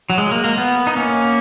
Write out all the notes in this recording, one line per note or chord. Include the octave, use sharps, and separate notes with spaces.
F#3
G#3
A#3
A#3
B3
D#4
A#3 C#4